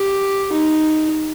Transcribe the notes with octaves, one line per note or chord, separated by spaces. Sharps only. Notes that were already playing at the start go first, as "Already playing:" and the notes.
Already playing: G4
D#4